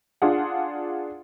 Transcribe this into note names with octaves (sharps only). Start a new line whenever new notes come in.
D4 F4 G#4 F#5